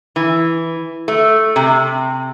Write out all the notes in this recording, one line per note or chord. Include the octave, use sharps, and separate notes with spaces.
E3
A3
C3